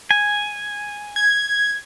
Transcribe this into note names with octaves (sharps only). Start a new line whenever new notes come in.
G#5
G#6